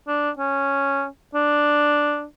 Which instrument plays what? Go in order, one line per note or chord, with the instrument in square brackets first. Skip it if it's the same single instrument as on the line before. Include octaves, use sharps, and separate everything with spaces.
[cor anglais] D4
C#4
D4